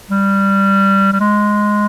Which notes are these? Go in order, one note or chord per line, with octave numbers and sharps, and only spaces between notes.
G3
G3
G#3